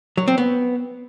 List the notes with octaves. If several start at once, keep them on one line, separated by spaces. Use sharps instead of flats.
F#3
C4
B3